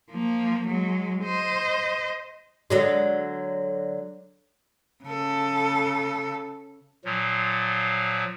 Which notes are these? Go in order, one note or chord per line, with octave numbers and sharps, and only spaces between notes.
F3 A#3
F#3 G#3
C5 D#5
D3 F#3 G#3
C#3 A4
A#2 F3 F#3